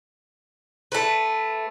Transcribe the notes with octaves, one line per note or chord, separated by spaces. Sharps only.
A3 B4